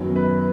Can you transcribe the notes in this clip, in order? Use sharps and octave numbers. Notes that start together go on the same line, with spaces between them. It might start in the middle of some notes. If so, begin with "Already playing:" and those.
Already playing: F#2 D#3 F#3 B3
B4